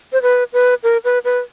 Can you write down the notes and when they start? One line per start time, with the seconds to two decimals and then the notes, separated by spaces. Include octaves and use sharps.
0.13 C5
0.22 B4
0.53 B4
0.83 A#4
1.04 B4
1.24 B4